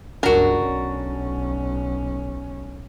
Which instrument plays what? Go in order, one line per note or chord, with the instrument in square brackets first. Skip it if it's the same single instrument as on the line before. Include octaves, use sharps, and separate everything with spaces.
[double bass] G1 C#2 [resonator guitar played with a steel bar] D4 F#4 [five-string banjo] A#4
[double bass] B1 C#4